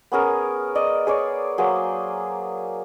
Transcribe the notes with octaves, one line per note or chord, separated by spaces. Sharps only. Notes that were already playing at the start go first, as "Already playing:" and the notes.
B3 C#4 G#4 A#4
D5 D#5
G#4 C#5 D5
F#3 A#3 G#4 C5